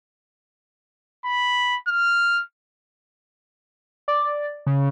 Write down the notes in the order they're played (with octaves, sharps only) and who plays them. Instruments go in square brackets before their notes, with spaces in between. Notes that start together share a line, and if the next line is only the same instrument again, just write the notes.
[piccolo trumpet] B5
F6
[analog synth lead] D5
C#3